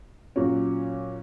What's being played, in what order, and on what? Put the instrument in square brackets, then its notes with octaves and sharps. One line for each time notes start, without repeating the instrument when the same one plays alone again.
[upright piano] A#2 F#3 C#4 F#4